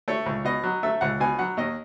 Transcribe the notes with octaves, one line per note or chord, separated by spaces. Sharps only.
A3 C#5
C#2
B2 D#5
F#3
A3 E5
C#2 F#5
B2 G#5
F#3 F#5
D#2 D#5